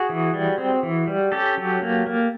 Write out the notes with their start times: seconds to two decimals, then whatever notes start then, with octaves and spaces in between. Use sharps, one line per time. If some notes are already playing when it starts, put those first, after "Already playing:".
Already playing: F#4 G#4
0.09 E3
0.34 G3
0.58 C4
0.83 E3
1.07 G3
1.32 C#4 G4 A4
1.57 F#3
1.82 A#3
2.06 A#3